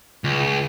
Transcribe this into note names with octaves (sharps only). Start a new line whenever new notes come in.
C#2